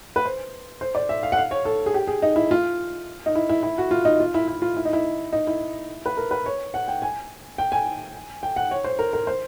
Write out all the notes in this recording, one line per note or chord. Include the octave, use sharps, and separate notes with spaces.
B4
C5
C5
D5
E5
F5
F#5
F5
C#5
A4
G#4
G4
G#4
D#4
E4
F4
D#4
E4
E4
E4
F#4
F4
D#4
F4
E4
E4
F4
E4
D#4
E4
D#4
E4
B4
A#4
B4
C#5
F#5
G5
G#5
G5
G#5
G5
F#5
C#5
C5
A#4
A#4
C5